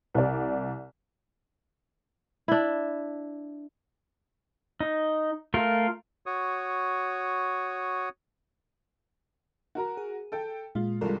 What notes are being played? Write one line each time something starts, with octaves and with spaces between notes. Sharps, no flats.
C2 D5
D4 E4
D#4
A3 F4 A#4
F#4 C#5 D#6
F#4 A#4 A#5
G#4
A4 G5
A#2 G#3 F4
C2 G2 G#3 F4 A4 A#4